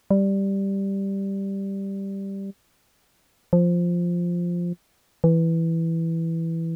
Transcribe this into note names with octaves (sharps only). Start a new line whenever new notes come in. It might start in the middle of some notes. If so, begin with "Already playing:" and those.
G3
F3
E3